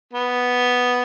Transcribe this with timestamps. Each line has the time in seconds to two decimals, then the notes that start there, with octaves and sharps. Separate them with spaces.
0.14 B3